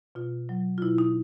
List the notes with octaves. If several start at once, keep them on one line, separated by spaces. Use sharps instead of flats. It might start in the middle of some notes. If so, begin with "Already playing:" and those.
B2 F4
F#3
F4
B2 E4
D#4